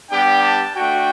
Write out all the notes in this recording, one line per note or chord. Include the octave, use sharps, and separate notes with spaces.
G3 B3 D4 G4 G5
A5
A3 D4 F#4 G5